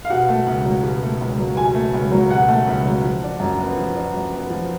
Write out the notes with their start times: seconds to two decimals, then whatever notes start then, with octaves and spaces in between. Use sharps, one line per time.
0.05 F5
0.10 B2 F#5
0.29 A3
0.46 C#2
0.65 F#3
0.83 B2
1.02 A3
1.21 C#2
1.38 F#3
1.57 B2 G#5
1.75 A3
1.94 C#2
2.11 F#3
2.30 B2 F#5
2.48 A3
2.67 C#2
2.86 F#3
3.04 F3
3.23 D4
3.40 F#2
3.59 B3
3.77 F3
3.95 D4
4.13 F#2
4.33 B3
4.50 F3